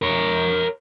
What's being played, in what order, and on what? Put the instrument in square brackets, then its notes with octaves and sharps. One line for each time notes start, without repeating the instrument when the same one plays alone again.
[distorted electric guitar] A#4 C#5